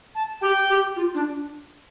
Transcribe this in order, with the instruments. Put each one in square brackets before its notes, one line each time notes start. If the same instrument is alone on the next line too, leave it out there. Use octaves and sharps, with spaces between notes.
[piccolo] A5
[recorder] G4 [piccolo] G5
[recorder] G4
F4
D4